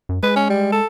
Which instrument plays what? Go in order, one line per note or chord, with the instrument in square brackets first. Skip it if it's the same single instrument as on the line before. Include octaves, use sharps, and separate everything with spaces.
[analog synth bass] F#2
[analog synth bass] G#3 [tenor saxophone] B4
[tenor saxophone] C#4
G3
A4